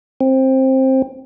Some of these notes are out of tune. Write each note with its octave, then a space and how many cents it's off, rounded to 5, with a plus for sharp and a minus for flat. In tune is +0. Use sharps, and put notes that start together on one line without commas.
C4 +15